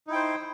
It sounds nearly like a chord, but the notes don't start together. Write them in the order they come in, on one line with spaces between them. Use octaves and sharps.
D#4 E4 G5 C5